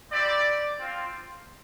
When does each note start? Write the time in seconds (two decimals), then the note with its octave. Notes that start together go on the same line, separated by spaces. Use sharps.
0.12 C4 E4 G4 D5
0.79 C4 F4